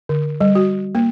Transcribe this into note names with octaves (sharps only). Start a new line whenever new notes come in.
D3
G3
F#4
A#3